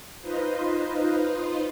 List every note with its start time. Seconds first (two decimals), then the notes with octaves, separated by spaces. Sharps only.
0.22 D#4 F4 B4 C5 D#5